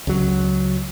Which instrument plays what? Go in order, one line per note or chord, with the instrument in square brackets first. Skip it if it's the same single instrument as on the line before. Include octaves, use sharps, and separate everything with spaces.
[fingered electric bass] C#2 F#3